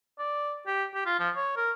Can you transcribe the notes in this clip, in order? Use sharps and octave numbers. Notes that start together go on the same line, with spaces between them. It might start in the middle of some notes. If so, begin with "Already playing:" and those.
D5
G4
G4
F4
F3
C#5
A#4